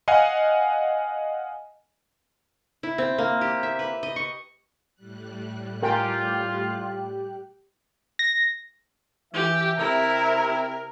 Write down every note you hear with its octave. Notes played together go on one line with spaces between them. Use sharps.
D#5 F5 F#5 G#5
E4
C4
A#3
G4
E5
B4
D#5
C#6
A2 G3 F#6
F4 G4 A#4 G5 G#5
A#6
E3 G4 E5
C3 E4 A#4